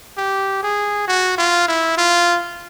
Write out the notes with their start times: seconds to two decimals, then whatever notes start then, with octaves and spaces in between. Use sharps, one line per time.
0.17 G4
0.63 G#4
1.07 F#4
1.38 F4
1.68 E4
1.97 F4